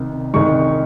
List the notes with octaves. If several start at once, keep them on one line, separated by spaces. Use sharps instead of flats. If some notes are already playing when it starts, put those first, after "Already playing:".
Already playing: C2 C3 D#3
C2 C3 D#3 G#3 C#6